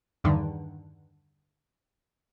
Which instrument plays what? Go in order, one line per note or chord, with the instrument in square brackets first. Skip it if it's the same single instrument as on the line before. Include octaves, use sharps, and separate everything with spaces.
[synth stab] E2 G2 D3 D#3